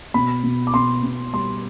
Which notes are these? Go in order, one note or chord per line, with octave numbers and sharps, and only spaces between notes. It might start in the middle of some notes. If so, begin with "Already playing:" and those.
B2 B5
B2
D6
B2 C6
B2
G3 C6